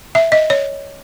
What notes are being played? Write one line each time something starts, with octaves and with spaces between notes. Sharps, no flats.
E5
D#5
C#5